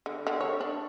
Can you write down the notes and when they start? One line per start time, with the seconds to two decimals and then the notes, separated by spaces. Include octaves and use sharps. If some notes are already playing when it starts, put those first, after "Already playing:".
0.06 D3
0.27 D3
0.41 C#5
0.61 D4